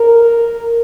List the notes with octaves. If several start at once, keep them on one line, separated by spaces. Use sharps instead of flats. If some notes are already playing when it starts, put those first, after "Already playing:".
Already playing: A#4